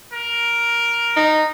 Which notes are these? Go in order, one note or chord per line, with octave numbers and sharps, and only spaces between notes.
A#4
D#4